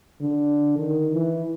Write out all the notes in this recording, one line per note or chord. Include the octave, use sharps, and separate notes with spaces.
D3
D#3
E3